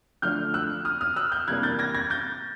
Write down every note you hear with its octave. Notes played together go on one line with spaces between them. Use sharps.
D3 F3 A3 D4 F6 G6
E6 F#6
D#6 F6
D#6 F6
E6 F#6
F6 G6
C3 E3 G3 A#3 D4 F#6 G#6
G6 A6
G#6 A#6
G#6 A#6
G6 A6